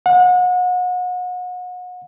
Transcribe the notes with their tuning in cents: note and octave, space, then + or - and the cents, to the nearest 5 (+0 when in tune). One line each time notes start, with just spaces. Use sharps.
F#5 -35